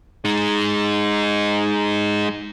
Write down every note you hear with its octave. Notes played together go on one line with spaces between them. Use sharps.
G#3 D#4